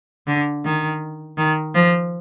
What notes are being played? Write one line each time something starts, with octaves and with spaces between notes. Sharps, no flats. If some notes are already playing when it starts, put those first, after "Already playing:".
D3
D#3
D#3
F3